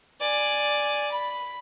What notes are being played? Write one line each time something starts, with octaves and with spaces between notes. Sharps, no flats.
D5 G#5
B5